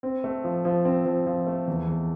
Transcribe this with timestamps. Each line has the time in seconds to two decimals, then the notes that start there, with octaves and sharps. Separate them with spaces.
0.03 C4
0.24 A3
0.44 F3
0.65 F3
0.85 C4
1.05 F3
1.26 F3
1.47 A3
1.67 E2
1.88 E2